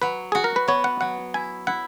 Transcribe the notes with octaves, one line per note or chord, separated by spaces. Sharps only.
F#3 B4
F#4 G#4
A#4
B4
B3 C#5
F#5
F#3 F#5
E4 G#5
E4 F#5